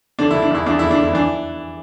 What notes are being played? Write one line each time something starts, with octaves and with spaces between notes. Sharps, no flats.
D3 D4
D3 E4
D4
E2 E4
E2 D4
D3 E4
D4
D3
E4
E3 D4